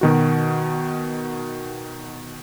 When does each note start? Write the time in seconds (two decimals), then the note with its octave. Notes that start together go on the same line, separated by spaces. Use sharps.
0.01 B2 D#3 F#4